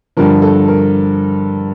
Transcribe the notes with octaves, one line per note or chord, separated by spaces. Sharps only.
G2 D3 F3 A#4
A4
A#4